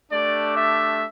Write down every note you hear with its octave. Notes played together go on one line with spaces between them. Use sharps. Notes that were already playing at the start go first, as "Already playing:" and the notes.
A3 D4 G4 D5
E5